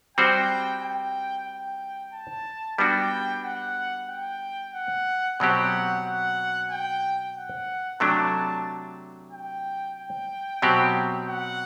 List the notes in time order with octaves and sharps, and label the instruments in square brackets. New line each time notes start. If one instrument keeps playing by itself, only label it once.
[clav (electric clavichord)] G3 C4 F#4 C5 [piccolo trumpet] G5
[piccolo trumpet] G5
G5
A5
[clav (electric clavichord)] G3 B3 D4 F#4 [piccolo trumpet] G5
[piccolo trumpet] F#5
G5
F#5
[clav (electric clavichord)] B2 F#3 C4 G4 [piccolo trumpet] F#5
[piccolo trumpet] F#5
G5
F#5
[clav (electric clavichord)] C3 F#3 A3 D4 [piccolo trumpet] A5
[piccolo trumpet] G5
G5
[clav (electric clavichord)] B2 F#3 C4 G4
[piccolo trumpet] F#5